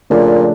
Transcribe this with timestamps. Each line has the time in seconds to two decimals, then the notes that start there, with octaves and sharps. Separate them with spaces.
0.10 A#2 C#3 F3 A3 D4